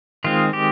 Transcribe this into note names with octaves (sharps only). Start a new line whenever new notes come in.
D#3 G#3 C4 F4
G4